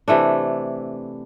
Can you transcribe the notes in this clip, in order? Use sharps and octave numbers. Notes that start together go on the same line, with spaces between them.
C3 E3 A3 D4